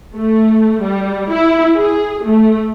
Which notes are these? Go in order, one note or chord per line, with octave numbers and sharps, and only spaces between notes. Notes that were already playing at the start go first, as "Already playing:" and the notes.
A3
G3
E4
G#4
A3